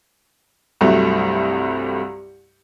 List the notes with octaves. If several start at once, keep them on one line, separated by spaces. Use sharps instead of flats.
C2 G2 F#3 A3